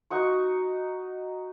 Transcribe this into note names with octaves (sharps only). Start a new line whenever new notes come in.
D#4 F#4 C#6